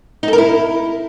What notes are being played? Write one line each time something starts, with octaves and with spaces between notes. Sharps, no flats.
D#4
A4
A#4
E4